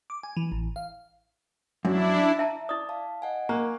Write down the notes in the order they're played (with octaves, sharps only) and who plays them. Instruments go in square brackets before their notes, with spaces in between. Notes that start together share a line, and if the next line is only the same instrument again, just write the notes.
[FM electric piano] D6
G#5
E3
A1
F5
[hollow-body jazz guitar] F#2 [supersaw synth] D4 E4
[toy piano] E5 A5 A#5
[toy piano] E4 D#6 [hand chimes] D5
[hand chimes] F5 A5
D#5 F#5 G#5
[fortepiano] A#3 [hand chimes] G#5 C#6 F#6